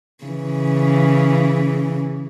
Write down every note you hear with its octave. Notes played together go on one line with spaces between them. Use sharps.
C#3 E3